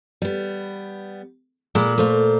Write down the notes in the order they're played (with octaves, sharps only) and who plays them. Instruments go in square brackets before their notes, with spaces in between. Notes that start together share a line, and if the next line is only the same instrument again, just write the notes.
[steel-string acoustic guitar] G3 B3
[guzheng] A#2 B5 [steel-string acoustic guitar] G#3
[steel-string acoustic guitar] A3 C5 F5